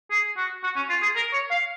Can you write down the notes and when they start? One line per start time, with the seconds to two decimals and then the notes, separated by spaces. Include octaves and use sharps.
0.11 G#4
0.37 F#4
0.63 F#4
0.76 C#4
0.89 F4
1.02 G#4
1.15 A#4
1.33 C#5
1.50 F5